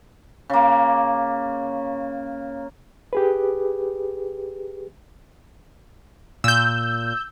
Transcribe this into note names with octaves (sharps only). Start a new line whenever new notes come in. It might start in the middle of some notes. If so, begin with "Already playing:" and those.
C#3 A#3
G4 G#4 B4
A#2 E6 G6